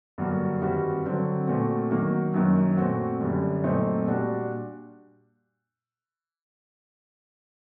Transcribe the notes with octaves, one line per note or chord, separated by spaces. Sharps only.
G2 D3 F#3 A#3 F#4
G2 D#3 G3 C4 F#4
D3 F#3 C4 F#4
A#2 A3 C4 F#4
D#3 F#3 A#3 F#4
F#2 D#3 F#3 A#3
A#2 A3 C4 F#4
F#2 D3 G3
A#2 F#3 A3 C4 D#4
A#2 G3 D4 F#4